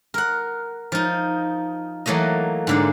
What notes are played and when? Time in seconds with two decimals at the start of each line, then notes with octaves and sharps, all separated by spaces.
0.14 A#4 F#5
0.92 F3 D#4
2.06 E3 F#3 A3 A#3 D#5
2.67 G#2 D3 A#3